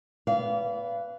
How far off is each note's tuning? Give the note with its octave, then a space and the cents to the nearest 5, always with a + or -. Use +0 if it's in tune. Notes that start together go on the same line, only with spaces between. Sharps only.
B3 +0 D5 -35 F5 -30